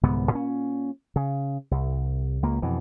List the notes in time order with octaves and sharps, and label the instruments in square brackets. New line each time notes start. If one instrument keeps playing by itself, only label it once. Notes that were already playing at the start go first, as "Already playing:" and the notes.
[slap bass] C2 G#2 D3 B3
A#2 C4 C#4
C#3
C2
C#2 A#3
F2 B2 E3